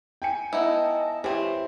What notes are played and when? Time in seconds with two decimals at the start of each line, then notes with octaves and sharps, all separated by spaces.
0.22 G5 G#5 C#7
0.53 B3 D#4 E4 D#5 A5
1.24 E3 C4 G4 C5 C#5